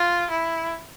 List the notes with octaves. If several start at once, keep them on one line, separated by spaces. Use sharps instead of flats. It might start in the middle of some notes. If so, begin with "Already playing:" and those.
Already playing: F4
E4